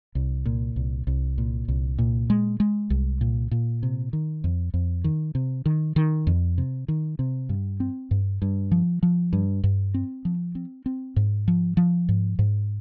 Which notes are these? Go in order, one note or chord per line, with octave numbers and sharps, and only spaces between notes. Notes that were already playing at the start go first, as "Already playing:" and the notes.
C2
A#2
C2
C2
A#2
C2
A#2
G#3
G#3
C2
A#2
A#2
C3
D#3
F2
F2
D#3
C3
D#3
D#3
F2
C3
D#3
C3
G2
C4
G2
G2
F3
F3
G2
G2
C4
F3
C4
C4
G#2
F3
F3
G#2
G#2